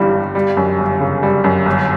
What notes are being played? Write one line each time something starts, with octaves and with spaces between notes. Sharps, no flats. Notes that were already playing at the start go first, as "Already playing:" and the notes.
Already playing: G1 G2 E3 G3
G2
G3
F#2
G1
C#3
G3
F#2
G1